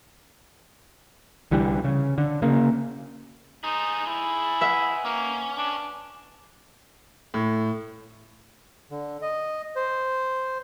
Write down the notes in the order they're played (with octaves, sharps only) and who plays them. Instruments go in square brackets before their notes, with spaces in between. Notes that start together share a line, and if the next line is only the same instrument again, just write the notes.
[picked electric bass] C2 D3 E3 G3
C#3
D3
C#3 A#3
[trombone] D#4 [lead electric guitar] G#4 C5
[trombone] E4
[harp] B4 E5 F#5
[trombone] A#3 [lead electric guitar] C#4
[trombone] D4
[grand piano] A2
[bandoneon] D3
D#5
C5